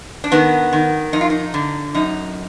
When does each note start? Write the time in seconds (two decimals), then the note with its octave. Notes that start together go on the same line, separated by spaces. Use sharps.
0.24 D4
0.32 D#3 B3
0.73 D#3
1.13 F2 D#4
1.21 F4
1.30 D#4
1.54 D3
1.94 F#2 D#4